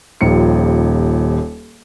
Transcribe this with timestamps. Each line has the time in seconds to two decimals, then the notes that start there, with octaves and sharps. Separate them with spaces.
0.21 D#1 D#2 F3 C#7